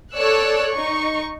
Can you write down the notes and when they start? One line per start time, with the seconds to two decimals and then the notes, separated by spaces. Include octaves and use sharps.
0.15 A4 C#5 D5 E6 F#6
0.71 D#4 C#6